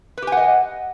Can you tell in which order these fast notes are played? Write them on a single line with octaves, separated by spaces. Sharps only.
B4 G4 G#5 F#5 D#5